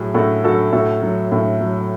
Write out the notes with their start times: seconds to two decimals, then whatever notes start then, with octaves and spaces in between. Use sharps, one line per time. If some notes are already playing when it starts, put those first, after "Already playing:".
Already playing: A2 F#3 G#4
0.14 A2 F#4 A4
0.44 F#3 F#4 A4
0.72 A2 F#4 A4
1.03 F#3
1.32 A2
1.61 F#3